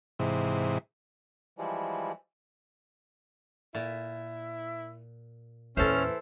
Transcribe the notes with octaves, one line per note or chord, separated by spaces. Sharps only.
G#2 C3 E3
E3 F3 G3 G#3
A#2 E4
E2 A#2 E3 C#4 A4 C5 F6